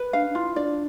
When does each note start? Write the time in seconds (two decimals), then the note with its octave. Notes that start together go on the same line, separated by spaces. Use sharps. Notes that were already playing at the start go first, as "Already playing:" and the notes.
Already playing: B4
0.13 D4 F5
0.30 D4
0.35 E4 F4
0.56 D4 D5